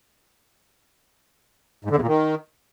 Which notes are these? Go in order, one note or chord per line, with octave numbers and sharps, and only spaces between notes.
G#2
D3
E2
A#2
D#3